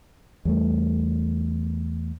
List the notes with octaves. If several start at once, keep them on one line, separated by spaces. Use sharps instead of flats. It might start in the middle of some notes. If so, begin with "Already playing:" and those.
E2 G3 A3